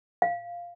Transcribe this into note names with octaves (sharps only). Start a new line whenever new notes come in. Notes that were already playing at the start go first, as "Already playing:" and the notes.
F5